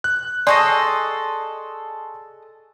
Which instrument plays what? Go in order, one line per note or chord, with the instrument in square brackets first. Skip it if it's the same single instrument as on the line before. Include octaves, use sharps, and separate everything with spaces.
[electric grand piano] F#6
[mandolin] G#4 A4 D#5 [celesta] D5 [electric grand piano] C6 C#6 C7